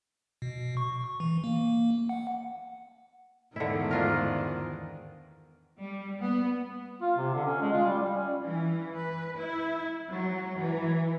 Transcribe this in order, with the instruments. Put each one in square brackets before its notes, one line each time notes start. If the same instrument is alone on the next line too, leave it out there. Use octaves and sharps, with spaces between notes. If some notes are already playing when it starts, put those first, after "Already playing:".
[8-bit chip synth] B2
C#6
E3
A#3
F#5
[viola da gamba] E2 G#2 D#3 [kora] D3 E4
[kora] D4 F4 A#4
[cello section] G3
B3
[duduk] F4
C3
D3
C#4
G#3
F4
G3
G3
C#4
[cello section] E3
B4
E4
F#3
E3